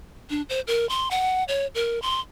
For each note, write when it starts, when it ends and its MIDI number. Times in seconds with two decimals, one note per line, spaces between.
0.30 0.42 62
0.49 0.61 72
0.67 0.88 70
0.89 1.09 84
1.11 1.44 78
1.48 1.67 73
1.75 2.01 70
2.02 2.20 84